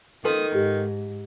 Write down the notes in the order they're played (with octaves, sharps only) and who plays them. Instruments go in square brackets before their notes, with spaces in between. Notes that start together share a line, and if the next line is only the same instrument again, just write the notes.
[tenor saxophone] D#3 [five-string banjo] F4 A4 B4 [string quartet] D#6
[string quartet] G#2 [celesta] G4